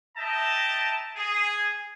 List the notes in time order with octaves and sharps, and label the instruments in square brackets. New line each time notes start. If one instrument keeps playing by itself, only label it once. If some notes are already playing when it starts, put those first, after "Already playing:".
[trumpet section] D#5 E5 G5 A5 A#5
G#4